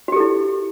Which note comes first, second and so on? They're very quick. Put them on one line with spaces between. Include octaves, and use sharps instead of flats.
F#4 G4 A4 E4